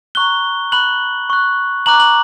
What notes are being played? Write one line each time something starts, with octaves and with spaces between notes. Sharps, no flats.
A#5 C#6 F#6 G7
B5 F#6 F#7
C#6 F#6
A#5 D6 F#6 F#7
F#7